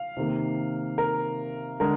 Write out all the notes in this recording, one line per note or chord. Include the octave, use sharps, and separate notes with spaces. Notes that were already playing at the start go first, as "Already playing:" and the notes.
Already playing: F5
C3 D#3 A#3
A#4
D3 G#3 A#4